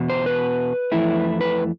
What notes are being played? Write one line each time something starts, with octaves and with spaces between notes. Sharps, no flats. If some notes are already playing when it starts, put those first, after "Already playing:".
Already playing: E2 B2
C5
B4
F2 E3 A3 E4
B4